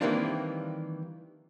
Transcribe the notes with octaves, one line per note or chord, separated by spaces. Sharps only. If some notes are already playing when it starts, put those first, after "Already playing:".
D#3 E3 G3 A#3 C4 D4